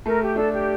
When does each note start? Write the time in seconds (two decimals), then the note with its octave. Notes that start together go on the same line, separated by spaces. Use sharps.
0.05 A3 A#4
0.21 G4
0.36 D4 A4
0.52 G4